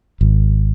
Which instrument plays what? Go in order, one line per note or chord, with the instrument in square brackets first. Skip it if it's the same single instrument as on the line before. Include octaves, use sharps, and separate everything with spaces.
[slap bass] G#1